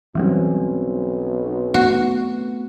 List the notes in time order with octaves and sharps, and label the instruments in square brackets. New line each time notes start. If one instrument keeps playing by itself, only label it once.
[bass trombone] B1 [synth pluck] E3 F#3 G3 [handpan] C4 C#4
[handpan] A3 B3 [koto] F#4